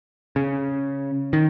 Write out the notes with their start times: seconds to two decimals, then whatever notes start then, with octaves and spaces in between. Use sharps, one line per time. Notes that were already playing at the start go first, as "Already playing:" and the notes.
0.36 C#3
1.33 D#3